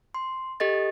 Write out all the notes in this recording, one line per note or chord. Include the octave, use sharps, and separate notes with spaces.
C6
G4 A4 D#5 A6